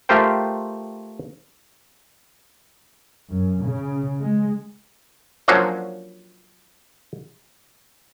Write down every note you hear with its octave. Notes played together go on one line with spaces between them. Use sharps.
A3 F4 G4 A#4 C5 G5
F#2
C#3
G#3
F3 F#3 A#3 C#4 D4 C5